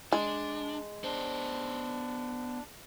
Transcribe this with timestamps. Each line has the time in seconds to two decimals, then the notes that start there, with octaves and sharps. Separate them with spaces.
0.12 G#3 D4
1.04 B3 D4 C5